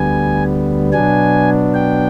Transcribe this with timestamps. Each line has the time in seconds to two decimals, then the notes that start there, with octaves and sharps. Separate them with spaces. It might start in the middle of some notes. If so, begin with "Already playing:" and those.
Already playing: D2 D3 G3 B3 G#5
0.92 B2 F#3 B3 D4 G#5
1.74 G5